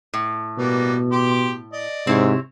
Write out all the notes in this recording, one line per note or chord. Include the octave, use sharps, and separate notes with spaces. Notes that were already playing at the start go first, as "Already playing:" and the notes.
A2
B2 G3 A#3 B3
G4 C6 D6
D5 D#5
G#2 C3 C4 E4 C#5